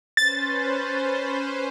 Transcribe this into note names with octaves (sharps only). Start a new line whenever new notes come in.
C#4 B4 C5 A6